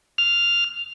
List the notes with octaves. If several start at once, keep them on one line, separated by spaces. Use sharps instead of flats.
F6